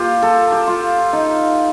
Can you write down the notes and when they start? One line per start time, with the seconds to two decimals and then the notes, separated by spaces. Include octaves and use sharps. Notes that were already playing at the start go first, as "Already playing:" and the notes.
Already playing: A#3 F4 G4
0.22 A4
0.52 G4
0.67 F4
1.13 D#4